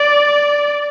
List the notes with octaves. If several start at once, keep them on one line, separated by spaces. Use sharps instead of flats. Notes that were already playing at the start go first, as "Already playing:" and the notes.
Already playing: D5